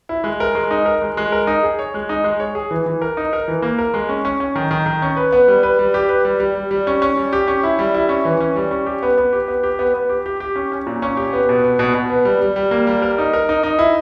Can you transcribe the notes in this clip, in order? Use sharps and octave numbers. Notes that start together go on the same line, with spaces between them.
E4
G#3
A#4
G#3
D#4
A#4
G#3
G#3
A#4
D#4
G#4
C#5
G#3
D#4
G#3
C#5
G#4
E3
E3
A#4
D#4
A#4
E3
A#3
A#4
G#3
C#4
C#4
C#4
D#3
D#3
D#3
C#4
B4
B3
G3
B4
G3
G4
B4
G3
G3
G3
G3
C#4
C#4
G3
G4
C#4
E4
G3
E4
C#4
E3
C#4
G3
C#4
G4
B3
B3
G4
B3
G4
B3
B3
G4
G4
G4
C#4
C#4
A#2
C#4
G4
B3
B2
B3
B2
B2
B3
G3
G3
G3
A#3
G3
A#4
D#4
A#4
D#4
D#4
E4